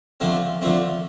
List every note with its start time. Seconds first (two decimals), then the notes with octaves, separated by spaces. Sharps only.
0.20 D3 F3 A3 C4
0.61 D3 F3 A3 C4